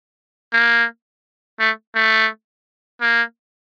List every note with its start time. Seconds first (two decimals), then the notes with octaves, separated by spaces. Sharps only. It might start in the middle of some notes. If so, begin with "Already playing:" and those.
0.53 A#3
1.60 A3
1.95 A3
3.01 A#3